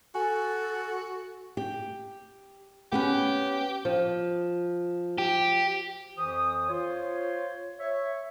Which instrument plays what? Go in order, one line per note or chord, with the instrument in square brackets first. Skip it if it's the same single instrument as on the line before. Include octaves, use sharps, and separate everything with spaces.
[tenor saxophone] F#4 [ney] A4 [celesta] G#5
[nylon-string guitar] G4
[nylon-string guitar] B3 C#4 B4 [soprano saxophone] G4
[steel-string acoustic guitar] F3
[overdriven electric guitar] G4
[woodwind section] F2 E3 C5 D#6
F4 C5 C#5
C#5 E5